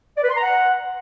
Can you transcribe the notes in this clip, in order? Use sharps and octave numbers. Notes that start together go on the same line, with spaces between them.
D5
B4
C6
A#5
F#5